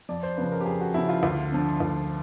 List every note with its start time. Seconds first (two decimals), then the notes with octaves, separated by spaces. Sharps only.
0.09 F2 D5
0.23 C5
0.37 C#3 F3 B4
0.52 A#4
0.61 G4
0.66 F2 G#4
0.81 F#4
0.94 C#3 F3 E4
1.09 F4
1.23 D2 F4
1.52 D3 F3
1.80 D2